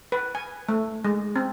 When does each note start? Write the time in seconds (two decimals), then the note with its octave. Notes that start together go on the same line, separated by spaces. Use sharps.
0.12 B4
0.35 G#5
0.69 A3
1.04 G#3
1.36 C4